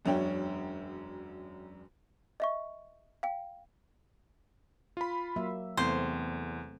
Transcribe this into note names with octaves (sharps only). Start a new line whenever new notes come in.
E1 F#2 C#4 D4 G5
D#5 E5 C#6
F5 G5
F4 B5
F#3 A#3 E5
E2 C3 A3 C4 C5